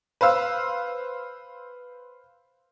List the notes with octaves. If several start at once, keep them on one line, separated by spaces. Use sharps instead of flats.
B4 C5 F5 E6